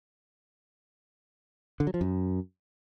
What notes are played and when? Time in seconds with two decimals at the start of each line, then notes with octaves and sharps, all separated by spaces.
1.80 D3
1.87 F#3
1.94 F3
2.01 F#2